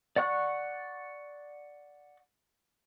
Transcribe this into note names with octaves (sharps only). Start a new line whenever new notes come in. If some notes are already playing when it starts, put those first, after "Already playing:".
D5 F#5 C#6 F#6